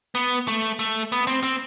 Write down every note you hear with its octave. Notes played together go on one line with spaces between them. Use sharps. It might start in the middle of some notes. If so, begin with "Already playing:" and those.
B3
A3
A3
B3
C4
C4